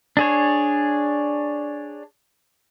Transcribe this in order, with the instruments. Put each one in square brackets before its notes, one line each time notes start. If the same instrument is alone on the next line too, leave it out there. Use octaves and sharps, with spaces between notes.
[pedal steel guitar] D4 G#4 C#5